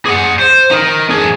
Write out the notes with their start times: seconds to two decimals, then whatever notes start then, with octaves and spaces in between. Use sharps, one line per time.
0.06 G#4 F#5
0.39 C5
0.71 D#4 A#4
1.10 D4 G#4